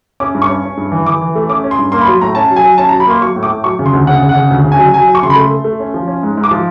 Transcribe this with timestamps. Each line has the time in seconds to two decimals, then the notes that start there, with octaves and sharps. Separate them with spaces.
0.20 C#4 D6
0.35 G2
0.42 C#6
0.49 C#4
0.64 C#4
0.77 G2
0.92 E3
1.06 E3 D6
1.21 E3
1.35 A3
1.49 C#4 D6
1.64 C#4
1.71 C6
1.79 G2
1.92 A#3 C6
2.01 B5
2.06 F#3 C6
2.21 A2 A#5
2.35 C#4 A5
2.50 F#3
2.56 G#5
2.64 F#3
2.78 C#4 A5
2.89 F#3 A#5
3.00 B5
3.07 A#3 C6
3.21 F#3 C#6
3.36 A2
3.43 D6
3.50 A2
3.64 F#3 C#6
3.79 C#3
3.86 C6
3.93 D2
4.07 C#3 F#5
4.22 C#3
4.29 F#5
4.35 C#3
4.50 D2
4.64 C#3
4.72 G#5
4.79 F#3
4.94 F#3 G#5
5.08 F#3
5.15 C#6
5.23 C#3 C6
5.30 B5
5.36 A3 C6
5.51 A3
5.64 A3
5.80 C#4
5.94 F3
6.08 C#4
6.23 G#2
6.37 G#2
6.44 D6
6.51 F3